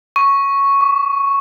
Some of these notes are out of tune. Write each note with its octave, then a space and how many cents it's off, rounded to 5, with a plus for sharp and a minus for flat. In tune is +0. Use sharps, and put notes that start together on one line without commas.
C#6 +0
C#6 +40